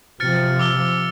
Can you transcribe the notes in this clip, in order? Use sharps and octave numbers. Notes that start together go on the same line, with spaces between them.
C3 F3 F6 A6 C#7
D6 E6 G7